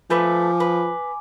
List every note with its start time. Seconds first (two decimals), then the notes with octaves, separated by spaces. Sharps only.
0.10 F3 A3 A4 B4 G#5 D6
0.60 B4